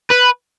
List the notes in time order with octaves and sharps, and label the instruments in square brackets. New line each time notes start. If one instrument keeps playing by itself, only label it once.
[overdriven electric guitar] B4